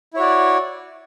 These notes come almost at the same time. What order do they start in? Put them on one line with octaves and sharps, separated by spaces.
E4 C#5 F#4 D5